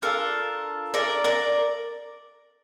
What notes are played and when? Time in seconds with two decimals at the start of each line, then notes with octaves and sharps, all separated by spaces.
0.02 D4 F4 A4 A#4
0.94 A#4 D5
1.24 A#4 D5